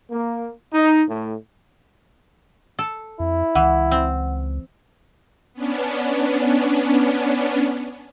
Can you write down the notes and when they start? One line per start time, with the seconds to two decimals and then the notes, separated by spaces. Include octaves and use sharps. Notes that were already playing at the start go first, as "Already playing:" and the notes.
0.11 A#3
0.73 D#4
1.08 A2
2.79 A4
3.20 F2 E4
3.55 C#2 E3 F#5
3.91 C4
5.54 B3 C#4 D4